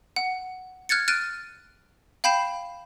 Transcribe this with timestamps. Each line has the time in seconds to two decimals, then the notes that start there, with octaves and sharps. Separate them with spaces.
0.16 F#5
0.89 F6 F#6 G#6 A6 C#7
1.08 F6 F#6 A6 D7 D#7
2.24 F5 G5 B5 G6 C7 E7